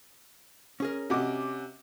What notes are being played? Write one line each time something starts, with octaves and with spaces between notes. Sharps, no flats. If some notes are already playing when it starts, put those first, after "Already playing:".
C#4 G#4 A#4
C3 C#4 F#4 D#5 D6